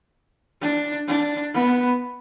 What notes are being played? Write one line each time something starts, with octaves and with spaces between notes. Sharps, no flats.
D4
D4
B3